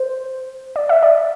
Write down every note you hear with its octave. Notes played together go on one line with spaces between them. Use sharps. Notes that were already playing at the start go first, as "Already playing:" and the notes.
Already playing: C5
D5
E5
D5